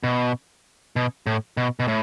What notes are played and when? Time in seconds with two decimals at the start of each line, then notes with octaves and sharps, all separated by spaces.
0.04 B2
0.96 B2
1.27 A2
1.57 B2
1.80 B2
1.88 A2